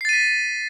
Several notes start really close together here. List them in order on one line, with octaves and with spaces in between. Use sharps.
C7 A6 D#7 B6